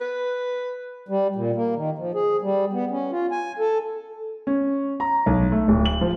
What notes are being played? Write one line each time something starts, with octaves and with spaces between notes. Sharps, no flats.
B4
G3
A#2
A#3
D#3
F3
G#4
G3
B3
C#4
F4
G#5
A4
C#4
A#5
B1
A3
D1
F#7
F3